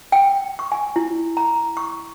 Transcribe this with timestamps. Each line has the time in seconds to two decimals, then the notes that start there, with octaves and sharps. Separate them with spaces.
0.12 G5
0.59 C#6
0.72 G#5
0.96 E4
1.37 A#5
1.77 C#6